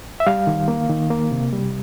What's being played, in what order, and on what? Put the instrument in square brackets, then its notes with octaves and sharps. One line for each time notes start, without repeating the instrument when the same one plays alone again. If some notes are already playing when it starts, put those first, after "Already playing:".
[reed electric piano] E5
G3 F5
D#3
A#3
D#3
A#3
C3
G3